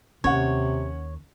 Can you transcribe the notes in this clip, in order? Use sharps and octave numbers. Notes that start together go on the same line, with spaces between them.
D#2 C3 C#4 C#5 F#5